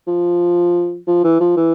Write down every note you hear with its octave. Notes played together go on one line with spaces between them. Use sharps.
F3
F3
E3
F3
E3